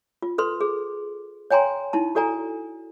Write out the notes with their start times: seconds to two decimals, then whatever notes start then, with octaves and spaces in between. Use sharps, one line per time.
0.22 F4
0.38 A4 B4 C6
0.61 G#4
1.50 C#5 G5 G#5 A#5 C6
1.93 D#4 E4 A5
2.15 F#4 A4 D5 G#5 A#5